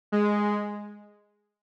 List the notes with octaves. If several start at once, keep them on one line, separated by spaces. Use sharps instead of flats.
G#3